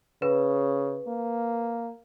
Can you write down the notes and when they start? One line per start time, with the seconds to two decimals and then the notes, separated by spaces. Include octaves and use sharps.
0.22 C#3 B4
1.08 A#3